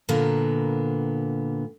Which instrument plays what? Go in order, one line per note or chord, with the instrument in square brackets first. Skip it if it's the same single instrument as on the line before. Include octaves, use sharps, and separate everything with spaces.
[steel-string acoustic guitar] A#2 D3 A#3 B3